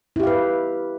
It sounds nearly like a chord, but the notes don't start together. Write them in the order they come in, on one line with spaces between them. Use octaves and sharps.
E4 G4 F5 B4